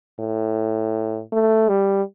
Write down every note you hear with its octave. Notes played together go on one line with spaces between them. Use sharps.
A2
A3
G3